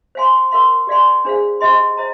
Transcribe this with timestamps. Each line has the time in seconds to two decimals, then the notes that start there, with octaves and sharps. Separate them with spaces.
0.15 C5 F5 G#5 C6
0.51 A#4 F5 C6
0.87 G4 D5 F5 G#5 C6
1.25 D4 G#4 C5 F5
1.60 G4 C5 D#5 G#5 C6
1.97 C5 D#5 A#5